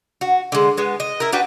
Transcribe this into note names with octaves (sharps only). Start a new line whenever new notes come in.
F#4
D3 G#3
G#3 B3
D#5
E4 A#4
D4 F#4 B4 G5